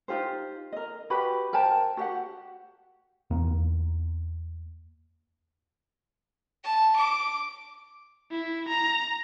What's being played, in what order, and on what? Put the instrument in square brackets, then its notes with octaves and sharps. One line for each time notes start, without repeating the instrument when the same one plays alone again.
[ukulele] D#4 F4 G4 C5
A#4 D#5
F#4 G4 B4 B5
A#4 C5 G5 A5
F#4 G4 E5 F#5
[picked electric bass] E2 A#3
[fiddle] A5
D6
[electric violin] E4
A#5